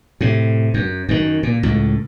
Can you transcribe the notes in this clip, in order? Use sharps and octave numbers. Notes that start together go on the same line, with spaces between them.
A2 C3
F#2
F#2 D#3
A#2
C#2 A2